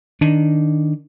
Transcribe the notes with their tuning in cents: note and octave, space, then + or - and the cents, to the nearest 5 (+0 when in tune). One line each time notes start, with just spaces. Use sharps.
D#3 -5 D4 -5